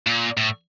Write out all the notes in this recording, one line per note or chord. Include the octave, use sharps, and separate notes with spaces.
A#2
A2